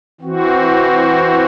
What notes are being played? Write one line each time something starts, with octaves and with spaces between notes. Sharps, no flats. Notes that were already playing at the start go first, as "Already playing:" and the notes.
E3 C4 F#4